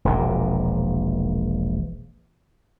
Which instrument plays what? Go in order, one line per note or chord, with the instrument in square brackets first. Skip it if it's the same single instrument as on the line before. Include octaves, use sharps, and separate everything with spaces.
[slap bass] E1 A#1 A#2